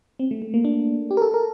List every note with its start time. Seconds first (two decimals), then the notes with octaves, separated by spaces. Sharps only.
0.19 C4
0.31 A3
0.42 A3
0.54 A#3
0.65 D4
1.11 G4
1.17 A#4
1.22 A4
1.34 A#4